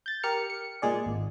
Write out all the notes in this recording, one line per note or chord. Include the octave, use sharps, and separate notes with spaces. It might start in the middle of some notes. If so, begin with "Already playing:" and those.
G6 A6
G4 A#4 F6 C#7
C#7
A#2 G#3 G#4 D5
G#1